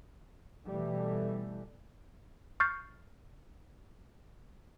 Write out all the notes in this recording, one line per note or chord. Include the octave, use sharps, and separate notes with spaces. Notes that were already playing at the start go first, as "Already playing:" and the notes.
B2 E3 G3 A3
C#6 F6 G6 A6 C7